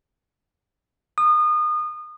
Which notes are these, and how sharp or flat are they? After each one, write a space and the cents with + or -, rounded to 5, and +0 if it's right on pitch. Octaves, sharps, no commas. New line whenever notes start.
D#6 -30